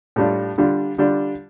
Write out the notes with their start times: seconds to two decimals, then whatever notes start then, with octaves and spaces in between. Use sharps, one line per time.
0.16 A2 G3 D4 F4
0.58 D3 G3 D4 F4
0.98 D3 G3 D4 F4